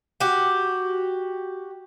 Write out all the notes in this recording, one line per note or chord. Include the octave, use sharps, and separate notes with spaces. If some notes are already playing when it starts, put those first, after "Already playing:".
F#4 G4